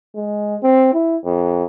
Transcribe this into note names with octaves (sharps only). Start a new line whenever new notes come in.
G#3
C4
E4
F2